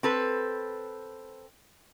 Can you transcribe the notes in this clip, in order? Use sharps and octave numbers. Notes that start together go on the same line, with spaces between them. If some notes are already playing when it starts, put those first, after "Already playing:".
C4 A4 B4